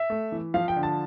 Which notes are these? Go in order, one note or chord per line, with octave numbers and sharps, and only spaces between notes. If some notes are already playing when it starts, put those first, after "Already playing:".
Already playing: E5
A3
E3
F3 F5
G5
D3
A5